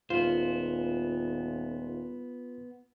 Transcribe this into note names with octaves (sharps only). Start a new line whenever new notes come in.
D#1 B3 F4 C5